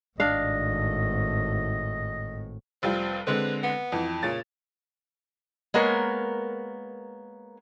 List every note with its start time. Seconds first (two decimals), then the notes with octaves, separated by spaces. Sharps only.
0.20 G#1 A2 D4 D#5 F5
2.83 F1 G3 C4 F4
3.27 D3 G#3 C4 B4
3.63 B3
3.92 F2 E3
4.23 A#2 C#3 A6
5.74 G#3 A#3 B3 A#4 C#5